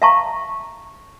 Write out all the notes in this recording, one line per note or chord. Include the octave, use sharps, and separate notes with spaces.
E5 F5 A5 A#5 C#6